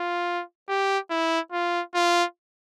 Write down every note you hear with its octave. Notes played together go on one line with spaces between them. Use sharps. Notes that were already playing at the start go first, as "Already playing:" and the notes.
Already playing: F4
G4
E4
F4
F4